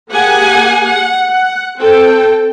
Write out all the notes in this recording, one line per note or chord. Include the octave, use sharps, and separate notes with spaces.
A#3 G4 G#4 F#5 G#5
F#5
F#5
C4 A4 G5